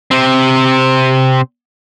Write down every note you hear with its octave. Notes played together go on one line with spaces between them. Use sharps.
C3 C4